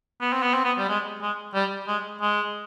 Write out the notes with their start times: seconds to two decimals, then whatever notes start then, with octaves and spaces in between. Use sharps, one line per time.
0.21 B3
0.33 C4
0.43 B3
0.54 C4
0.64 B3
0.78 G3
0.89 G#3
1.22 G#3
1.54 G3
1.88 G#3
2.22 G#3